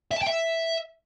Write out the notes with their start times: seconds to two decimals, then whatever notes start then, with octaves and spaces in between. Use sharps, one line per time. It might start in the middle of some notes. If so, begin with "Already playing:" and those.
0.11 E5
0.17 A5
0.22 G5
0.27 E5